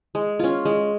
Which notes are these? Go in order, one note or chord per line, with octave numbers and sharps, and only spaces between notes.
G#3
C#4 F4
G#3